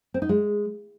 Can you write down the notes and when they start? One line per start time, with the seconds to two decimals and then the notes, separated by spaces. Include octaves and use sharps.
0.14 C4
0.22 D#4
0.29 G#3